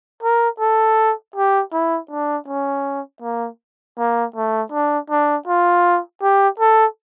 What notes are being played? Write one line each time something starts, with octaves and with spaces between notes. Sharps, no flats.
A#4
A4
G4
E4
D4
C#4
A#3
A#3
A3
D4
D4
F4
G4
A4